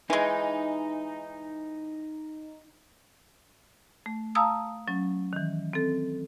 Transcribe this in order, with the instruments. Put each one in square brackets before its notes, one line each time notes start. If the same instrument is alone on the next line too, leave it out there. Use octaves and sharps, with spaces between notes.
[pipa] E3 G#3 [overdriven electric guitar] D#4
[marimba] A3
F5 A5 A#5 D#6 E6
F#3 C#4
D#3 E3
C4 A4